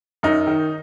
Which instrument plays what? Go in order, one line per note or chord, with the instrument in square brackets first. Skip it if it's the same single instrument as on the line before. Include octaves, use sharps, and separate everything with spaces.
[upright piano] F#2 D#4
D#3